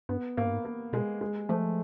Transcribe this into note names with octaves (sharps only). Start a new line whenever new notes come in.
G2 B3
G#2 A#3
G2
G#2
A#3
B2 G#3
G#3
F3 A3